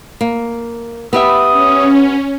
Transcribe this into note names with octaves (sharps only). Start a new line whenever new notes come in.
A#3
B3 G4 E5 D#6
C#4